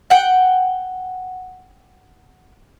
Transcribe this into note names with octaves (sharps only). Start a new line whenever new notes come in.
F#5 G5